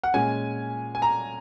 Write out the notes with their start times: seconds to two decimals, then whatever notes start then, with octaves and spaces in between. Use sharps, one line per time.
0.04 F#5
0.14 A#2 G#3 C#4 G#5
0.95 G#5
1.02 A#5